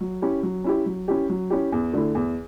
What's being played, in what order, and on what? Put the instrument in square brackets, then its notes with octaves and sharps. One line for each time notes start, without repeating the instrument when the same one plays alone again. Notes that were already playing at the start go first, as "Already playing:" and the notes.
[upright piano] F#3
C#4 E4 G4
F#3
C#4 E4 G4
F#3
C#4 E4 G4
F#3
C#4 E4 G4
E2
D3 A3 E4
E2